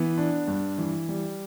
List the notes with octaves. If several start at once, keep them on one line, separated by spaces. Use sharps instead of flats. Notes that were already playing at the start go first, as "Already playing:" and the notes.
Already playing: E3 B3
D4
G2
E3
G3